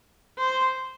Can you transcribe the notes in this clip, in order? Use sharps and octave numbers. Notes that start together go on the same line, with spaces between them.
C5